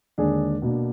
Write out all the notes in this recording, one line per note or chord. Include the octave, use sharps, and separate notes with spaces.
D#2 D3 G#3 D4 G#4
B2 A#3 D4